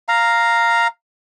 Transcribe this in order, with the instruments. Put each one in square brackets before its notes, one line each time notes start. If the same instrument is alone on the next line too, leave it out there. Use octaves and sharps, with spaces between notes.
[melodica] F5 A#5